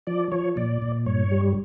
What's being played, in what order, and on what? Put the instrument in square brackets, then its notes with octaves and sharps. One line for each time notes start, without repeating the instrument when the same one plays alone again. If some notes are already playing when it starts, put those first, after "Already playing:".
[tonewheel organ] F3 D5
F3 C#5
A#2 D5
A#2
G2 C#5
G3